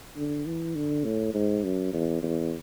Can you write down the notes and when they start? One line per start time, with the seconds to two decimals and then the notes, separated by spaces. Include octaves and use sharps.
0.16 D3
0.46 E3
0.75 D3
1.04 A2
1.34 G#2
1.64 F#2
1.93 E2
2.22 E2